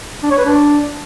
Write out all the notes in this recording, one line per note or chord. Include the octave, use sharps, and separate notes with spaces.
D4
C#5
B4
D4